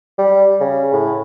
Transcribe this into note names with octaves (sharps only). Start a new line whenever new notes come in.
G3
C#3
A2